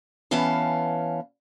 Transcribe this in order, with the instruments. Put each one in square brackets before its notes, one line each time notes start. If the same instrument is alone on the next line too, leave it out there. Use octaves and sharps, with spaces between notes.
[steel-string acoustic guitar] E3 B3 C#4 F5 A5